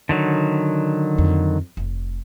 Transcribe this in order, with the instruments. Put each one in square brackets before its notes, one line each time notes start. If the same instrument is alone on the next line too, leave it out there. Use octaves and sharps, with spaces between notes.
[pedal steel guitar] D3 D#3 F#3
[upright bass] F2
F1